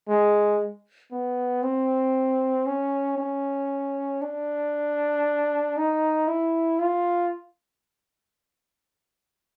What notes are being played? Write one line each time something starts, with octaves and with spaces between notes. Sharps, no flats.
G#3
B3
C4
C#4
C#4
D4
D#4
E4
F4